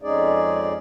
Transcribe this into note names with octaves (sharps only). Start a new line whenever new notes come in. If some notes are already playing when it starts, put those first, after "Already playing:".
F2 G#3 C#4 D#4 G#4 D5